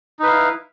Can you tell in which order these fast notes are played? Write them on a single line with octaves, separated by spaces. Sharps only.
D#4 B4 F5 E4